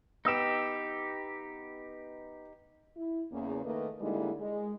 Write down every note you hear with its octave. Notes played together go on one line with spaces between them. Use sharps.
B3 D#4 G4 E6 E7
E4
E2 C#3 A#3
D#3 A3 A#3 B4 D#5
D3 G3 G#3 A#3 D#4 E4
G#3